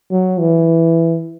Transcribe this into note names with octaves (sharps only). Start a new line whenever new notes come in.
F#3
E3